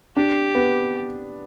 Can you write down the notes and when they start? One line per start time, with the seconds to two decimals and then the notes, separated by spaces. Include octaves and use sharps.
0.17 D4 G4
0.55 B3